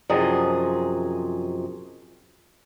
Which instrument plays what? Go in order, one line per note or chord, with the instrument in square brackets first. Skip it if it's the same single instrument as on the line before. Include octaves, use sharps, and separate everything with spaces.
[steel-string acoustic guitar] F#2 C3 F3 G#4 D#5